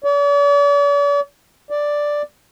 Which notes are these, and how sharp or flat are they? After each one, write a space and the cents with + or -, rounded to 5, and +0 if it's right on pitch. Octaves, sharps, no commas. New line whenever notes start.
D5 -45
D5 +0